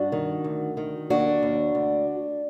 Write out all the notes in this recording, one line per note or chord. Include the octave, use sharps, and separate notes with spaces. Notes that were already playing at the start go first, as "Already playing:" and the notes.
Already playing: G2 D4 F#4
D#3
D2
D#3
D#2 D4 F#4
D#2
D2